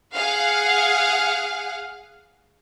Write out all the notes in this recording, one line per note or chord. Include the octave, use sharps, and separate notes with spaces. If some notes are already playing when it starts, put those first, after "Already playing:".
G#4 F5 F#5